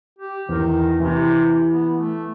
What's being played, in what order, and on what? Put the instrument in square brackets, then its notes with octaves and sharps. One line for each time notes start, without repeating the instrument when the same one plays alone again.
[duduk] G4
[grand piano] E2 [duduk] D#3
[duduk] C3 [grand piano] E3
[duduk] B3
A3